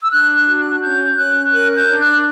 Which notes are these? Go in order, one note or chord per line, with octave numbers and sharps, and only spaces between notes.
E6
D4 F#6
F#6
F#4
F#6
C#4 G6
C#4 F#6
A#4 F#6
G6
D4
F#6